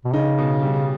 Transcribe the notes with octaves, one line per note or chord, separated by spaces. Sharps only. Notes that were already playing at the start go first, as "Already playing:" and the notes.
B2
C#3 D#4
B2
G3